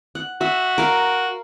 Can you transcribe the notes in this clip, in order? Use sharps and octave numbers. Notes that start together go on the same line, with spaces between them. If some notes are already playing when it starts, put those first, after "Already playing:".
F#5
F#4 E5
A#4 F5